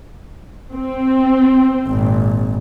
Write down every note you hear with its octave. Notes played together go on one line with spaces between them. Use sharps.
C4
G#1 A#2